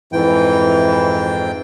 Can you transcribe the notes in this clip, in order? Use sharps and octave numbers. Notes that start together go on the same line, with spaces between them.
F2 G#2 E3 G5